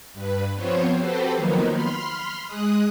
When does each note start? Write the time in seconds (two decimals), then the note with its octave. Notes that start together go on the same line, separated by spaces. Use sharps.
0.14 G2 B4
0.55 F3 B3 C4 C5 C#5
0.97 C4 F#4 G4 A4 B4 C5
1.36 D#3 F3 F#3 A#3 B3 D#4
1.71 B5 C6 F6
2.46 G#3 D#6 F#6